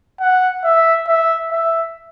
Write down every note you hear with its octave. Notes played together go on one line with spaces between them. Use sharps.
F#5
E5
E5
E5